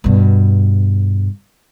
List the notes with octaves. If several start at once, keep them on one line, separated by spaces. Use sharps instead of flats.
G2 B2